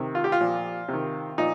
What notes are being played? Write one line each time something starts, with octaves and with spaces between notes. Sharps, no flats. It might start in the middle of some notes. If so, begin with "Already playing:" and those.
Already playing: C3 D#3
F4
G4
F4
A#2 F3
C3 D#3
A#2 F3 D#4